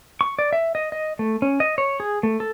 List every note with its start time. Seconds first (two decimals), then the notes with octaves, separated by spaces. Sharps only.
0.21 C#6
0.39 D5
0.53 E5
0.75 D#5
0.92 D#5
1.19 A3
1.42 C#4
1.60 D#5
1.78 C#5
2.00 G#4
2.23 A3
2.40 A4